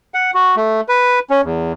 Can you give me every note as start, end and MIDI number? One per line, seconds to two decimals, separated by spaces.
0.14 0.31 78
0.34 0.55 66
0.56 0.81 57
0.89 1.19 71
1.30 1.41 61
1.44 1.72 40